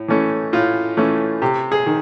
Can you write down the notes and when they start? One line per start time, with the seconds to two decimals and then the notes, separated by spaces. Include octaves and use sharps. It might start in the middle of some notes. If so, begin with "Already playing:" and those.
Already playing: A2
0.08 E3 A3 C#4
0.53 A2 F4
0.97 E3 A3 C#4
1.42 C3 G4
1.72 G#4
1.86 D#3